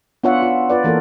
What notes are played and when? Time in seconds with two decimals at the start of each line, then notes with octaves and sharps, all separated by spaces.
0.24 B3 D4 F4 C#5 E5 F#5
0.42 F4
0.70 F4 B4 D5
0.84 E3 A#3 A4 A#4